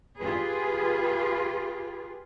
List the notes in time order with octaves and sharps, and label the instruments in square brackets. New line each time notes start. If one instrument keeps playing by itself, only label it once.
[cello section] F4 G4 G#4 B4